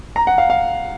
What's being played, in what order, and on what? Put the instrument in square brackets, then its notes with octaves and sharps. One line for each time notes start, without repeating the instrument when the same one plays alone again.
[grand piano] A#5
F#5
F5
F5